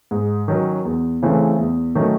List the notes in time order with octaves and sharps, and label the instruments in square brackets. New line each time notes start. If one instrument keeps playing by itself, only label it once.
[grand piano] G#2
D#3 F#3 C#4
E2
C#3 E3 A3 C4
E2
D#3 F#3 A3 C#4